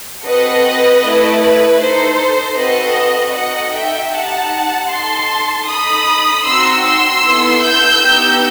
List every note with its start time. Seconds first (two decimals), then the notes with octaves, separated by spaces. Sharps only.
0.24 C4 F#4 A4 B4 D#5
1.03 A3 E4 A4
1.41 B4
1.80 D#4 A4 C5
2.57 C4 F#4 A4 B4 D#5
3.35 D#4 F#4 A4 D#5 F#5
3.74 E5 G5
4.12 D#4 G4 F#5 A5
4.90 D#4 A4 A5 C6
5.67 D#4 A4 B5 D#6
6.45 C4 D#4 F#4 C6 E6
6.85 C6 E6
7.23 B3 E4 A4
7.61 E6 G6
8.00 B3 D#4 G4